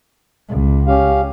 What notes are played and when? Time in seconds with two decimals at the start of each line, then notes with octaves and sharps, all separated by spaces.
0.49 C#2
0.87 C#4 G4 F5